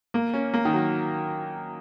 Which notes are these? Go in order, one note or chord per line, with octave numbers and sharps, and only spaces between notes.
A#3
C#4
A#3
D#3
F#3